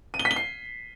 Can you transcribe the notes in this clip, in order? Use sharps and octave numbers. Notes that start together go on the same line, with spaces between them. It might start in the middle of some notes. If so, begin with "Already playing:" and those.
D#7
G7
B6
G7
C7